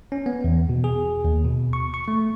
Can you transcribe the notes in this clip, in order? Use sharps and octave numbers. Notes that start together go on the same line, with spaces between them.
C#4
B3
E2
B2
G#4
D#2
B2
C#6
C#6
A3